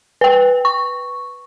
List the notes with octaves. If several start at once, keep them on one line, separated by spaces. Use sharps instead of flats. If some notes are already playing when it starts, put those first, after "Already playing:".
B4 G5
C#6